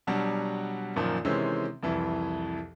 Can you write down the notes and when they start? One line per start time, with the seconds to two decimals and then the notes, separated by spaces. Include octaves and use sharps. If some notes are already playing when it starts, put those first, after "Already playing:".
0.07 B2 F#3 G3 D4
0.96 F#2 A#2 D#3 F3
1.25 C3 D#3 E3 G#3 C4 C#4
1.83 C2 F2 E3